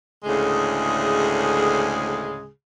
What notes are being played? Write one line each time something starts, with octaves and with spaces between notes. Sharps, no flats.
D2 A2 C#3 G#3 G#4